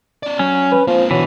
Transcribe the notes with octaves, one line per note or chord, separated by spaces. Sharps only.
C#4 D5
F#3 C#4
B4
F3 A#3 C4
B2 D3 E3 F#3